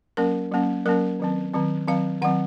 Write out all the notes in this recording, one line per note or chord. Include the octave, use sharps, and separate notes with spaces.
F#3 A#3 C#4 A#4
F#3 A#3 C#4
F#3 A#3 C#4 A#4
D#3 F#3 C4
D#3 F#3 C4
D#3 F#3 C4 F5
D#3 F#3 C4 F#5